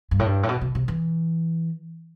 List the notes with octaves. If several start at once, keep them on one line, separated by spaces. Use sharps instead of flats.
G2
A2
G2
A2
B2
C3
C3
E3